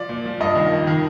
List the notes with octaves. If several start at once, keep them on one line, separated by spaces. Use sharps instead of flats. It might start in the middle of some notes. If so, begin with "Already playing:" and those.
Already playing: F3 D5
A#2
F3
G2 D#5
D#3
F2
D#3